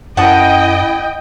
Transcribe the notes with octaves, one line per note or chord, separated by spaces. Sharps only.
F#2 E4 D#5 F#5 G5 A5 D#6